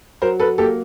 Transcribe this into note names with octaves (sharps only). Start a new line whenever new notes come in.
F#3 A#4 C5
A4 B4
A#3 G4 A4